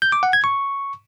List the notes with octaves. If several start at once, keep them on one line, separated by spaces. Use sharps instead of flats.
G6
D6
F#5
G#6
C#6